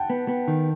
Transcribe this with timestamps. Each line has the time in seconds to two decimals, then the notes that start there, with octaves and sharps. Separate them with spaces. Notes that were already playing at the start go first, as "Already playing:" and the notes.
Already playing: F#5 G5 A5
0.10 B3
0.28 B3
0.48 D#3